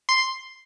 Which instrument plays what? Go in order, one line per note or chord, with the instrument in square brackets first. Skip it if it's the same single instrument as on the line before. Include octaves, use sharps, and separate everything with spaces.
[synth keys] C6